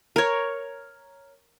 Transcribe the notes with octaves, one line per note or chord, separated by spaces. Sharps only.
A#4 C#5